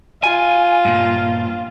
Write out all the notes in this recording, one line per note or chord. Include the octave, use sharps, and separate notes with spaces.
F4 G#5
G2 A#2